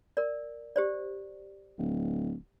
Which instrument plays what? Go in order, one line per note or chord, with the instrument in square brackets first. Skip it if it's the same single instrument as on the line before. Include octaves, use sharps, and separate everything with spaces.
[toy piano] A#4 D5
G4 C5 D5
[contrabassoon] D1